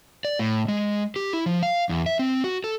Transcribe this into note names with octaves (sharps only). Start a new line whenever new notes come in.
D5
A2
G#3
G4
E4
F3
F5
E2
E5
C4
F#4
A4